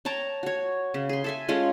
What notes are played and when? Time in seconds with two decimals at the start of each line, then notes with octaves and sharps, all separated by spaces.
0.05 C#5 G5 A5 A#5
0.43 F#4 C#5
0.94 C#3
1.09 G#4 C6
1.24 A4 E5 G#5
1.49 G#3 C#4 F4 A4